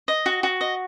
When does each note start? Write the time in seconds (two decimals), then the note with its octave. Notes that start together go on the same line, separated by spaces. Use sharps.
0.08 D#5
0.26 F#4
0.43 F#4
0.61 D#5